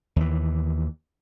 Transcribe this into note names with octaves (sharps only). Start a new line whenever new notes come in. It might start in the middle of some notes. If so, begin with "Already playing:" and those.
D#2 E3